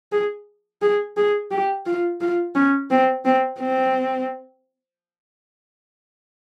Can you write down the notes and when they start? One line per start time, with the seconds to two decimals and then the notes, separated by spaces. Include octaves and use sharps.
0.12 G#4
0.82 G#4
1.17 G#4
1.51 G4
1.86 F4
2.21 F4
2.55 C#4
2.90 C4
3.25 C4
3.60 C4